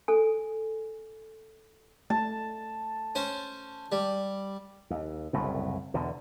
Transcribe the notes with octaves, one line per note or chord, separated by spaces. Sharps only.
A4 G#5
A3 A5
C#4 C5
G3
D#2
F#1 C2 F#2 A2
E2 B2 D3